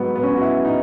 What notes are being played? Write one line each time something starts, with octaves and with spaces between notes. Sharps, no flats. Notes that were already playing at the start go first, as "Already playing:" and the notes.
Already playing: G#2 F#3 B3
B3
C#4
F#4
E4
D#4